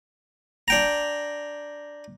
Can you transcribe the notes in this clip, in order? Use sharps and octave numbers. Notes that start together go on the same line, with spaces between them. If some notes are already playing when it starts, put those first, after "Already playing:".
D4 G5 A#5